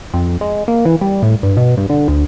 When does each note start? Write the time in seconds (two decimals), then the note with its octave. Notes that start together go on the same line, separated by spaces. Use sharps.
0.14 F2
0.41 G#3
0.68 A#3
0.85 E3
1.01 G3
1.22 A2
1.43 G2
1.57 B2
1.77 G2
1.89 D3
2.08 D2